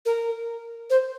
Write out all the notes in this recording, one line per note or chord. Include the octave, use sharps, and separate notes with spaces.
A#4
C5